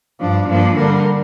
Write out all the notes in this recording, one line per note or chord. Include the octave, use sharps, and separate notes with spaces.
G2 F3 D4
G2 F3 A#3 D4
D3 G3 D4 A#4